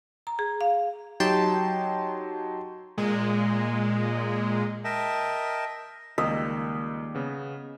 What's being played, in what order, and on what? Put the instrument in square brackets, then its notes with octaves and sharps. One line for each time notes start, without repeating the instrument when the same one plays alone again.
[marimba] A#5
G#4
F5
[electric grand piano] F#3 D#4 G4 [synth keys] G5 A5 C6
[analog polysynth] A#2 G#3
[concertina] A#4 D#5 E5 G5 A5
[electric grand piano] C#2 E6 B6 [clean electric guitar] D#3 G3 A#3 [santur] D#5
[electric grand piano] C#3 B3